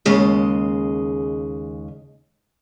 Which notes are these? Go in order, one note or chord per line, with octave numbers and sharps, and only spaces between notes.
D#2 C#3 G#3 D#5